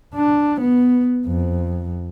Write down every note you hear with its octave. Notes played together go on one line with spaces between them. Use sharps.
D4
B3
F2